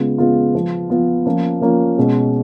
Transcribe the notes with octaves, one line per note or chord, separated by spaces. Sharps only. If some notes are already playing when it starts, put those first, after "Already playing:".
Already playing: C#3 G#3 B3 F4
C#3 G#3 B3 F4
F3 B3 F4
F3 B3 F4
F3 A#3 C#4 F4
F3 A#3 C#4 F4
B2 G#3 C#4